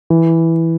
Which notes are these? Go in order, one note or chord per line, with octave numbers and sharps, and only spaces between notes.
E3